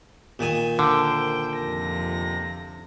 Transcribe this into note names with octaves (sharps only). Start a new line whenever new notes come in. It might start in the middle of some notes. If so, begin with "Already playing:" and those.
A#2 D#3 G#5
D3 A#4 C5 G5
F2 C3 A#6